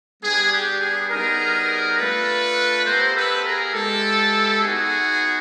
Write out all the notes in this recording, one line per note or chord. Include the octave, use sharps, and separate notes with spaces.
G3 B3 D4 G4 G#4
G4
G#4
G3 B3 D#4 G#4 A#4
A3 D4 F4 A4 B4
B3 E4 G4 A#4 C5
A4 B4
G#4 A#4
G#3 B3 E4 G4 A4
B3 D#4 F#4 G#4